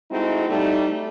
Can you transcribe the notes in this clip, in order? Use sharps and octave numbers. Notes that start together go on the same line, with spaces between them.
G#3 A3 C4 D#4 E4 F#4
G3 A3 D#4